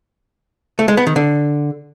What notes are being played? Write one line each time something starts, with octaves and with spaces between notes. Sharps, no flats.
A3
G#3
B3
D#3
D3